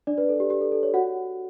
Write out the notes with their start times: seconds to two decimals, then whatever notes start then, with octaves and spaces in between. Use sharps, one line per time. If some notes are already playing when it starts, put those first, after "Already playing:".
0.07 D4 D5
0.18 B4
0.29 A4
0.40 G4
0.50 G4
0.61 A4
0.72 A4
0.83 C#5
0.94 F#4 F#5